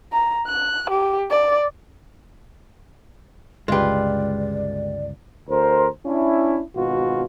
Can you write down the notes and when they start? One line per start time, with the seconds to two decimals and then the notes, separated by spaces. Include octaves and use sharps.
0.12 A#5
0.47 F#6
0.90 G4
1.30 D5
3.68 G1 C#2 G#3 F4 G4 B4 D5
5.49 D2 A#4 C5
6.06 C#4 D4 E4
6.75 G#1 B2 F4 F#4